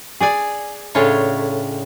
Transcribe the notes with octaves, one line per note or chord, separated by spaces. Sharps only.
G#4 D5 G#5
A2 C#3 D4 F4 C#5